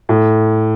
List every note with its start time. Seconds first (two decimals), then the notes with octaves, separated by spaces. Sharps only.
0.09 A2